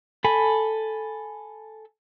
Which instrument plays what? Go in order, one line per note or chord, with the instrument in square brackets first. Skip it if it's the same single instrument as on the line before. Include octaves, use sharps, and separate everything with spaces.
[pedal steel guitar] A4 G#5 B5